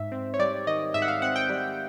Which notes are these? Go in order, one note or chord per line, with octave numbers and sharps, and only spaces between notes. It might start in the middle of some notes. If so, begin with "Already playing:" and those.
Already playing: G#2 E5
C4
C#5
G3 D5
D#3 D#5
G#2 E5
F#5
F5
C4 F#5
G5
G3